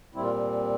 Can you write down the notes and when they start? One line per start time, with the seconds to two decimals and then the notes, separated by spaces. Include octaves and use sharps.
0.15 A#2 G3 C4 E4
0.23 F4